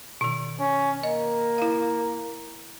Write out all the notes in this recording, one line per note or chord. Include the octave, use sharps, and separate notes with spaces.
B2 D#3
C#4
A#3 D#5
E4 F5